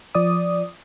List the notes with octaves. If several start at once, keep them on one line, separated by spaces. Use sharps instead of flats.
F3 D5 D#6